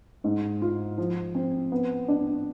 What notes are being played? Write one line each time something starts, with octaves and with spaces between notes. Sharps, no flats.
G#2
F4
F3
C4
B3
D4